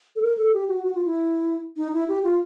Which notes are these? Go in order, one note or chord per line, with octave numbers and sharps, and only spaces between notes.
A4
A#4
A4
G4
F#4
F#4
F4
E4
D#4
E4
G4
F4